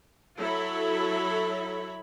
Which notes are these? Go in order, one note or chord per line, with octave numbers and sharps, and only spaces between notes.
F#3 E4 A4 C#5 E5 B5